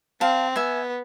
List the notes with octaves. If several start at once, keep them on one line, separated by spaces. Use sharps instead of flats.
C4 F5 A5
B3 E5 G#5